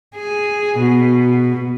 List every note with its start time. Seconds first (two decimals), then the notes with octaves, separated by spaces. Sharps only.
0.16 G#4
0.78 B2